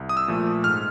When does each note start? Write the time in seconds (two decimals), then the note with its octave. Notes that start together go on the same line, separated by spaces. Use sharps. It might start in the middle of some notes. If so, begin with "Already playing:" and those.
Already playing: C2
0.09 D#6
0.17 E6
0.28 A#2 F3 A3
0.64 G#2 F6